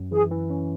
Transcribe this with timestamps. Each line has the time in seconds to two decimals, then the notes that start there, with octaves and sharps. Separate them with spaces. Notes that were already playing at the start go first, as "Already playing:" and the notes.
Already playing: F#2
0.12 E3 G#4
0.31 E3
0.50 C#4